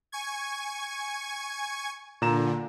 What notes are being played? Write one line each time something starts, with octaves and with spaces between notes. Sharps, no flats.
G#5 C#6 G#6
A#2 D3 A#5 E7